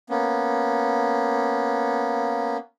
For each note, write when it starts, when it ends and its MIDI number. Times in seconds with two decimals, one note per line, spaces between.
0.10 2.57 58
0.10 2.57 59
0.10 2.57 61